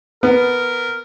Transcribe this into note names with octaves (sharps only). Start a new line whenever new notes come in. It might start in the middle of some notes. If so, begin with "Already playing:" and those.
B3 A#4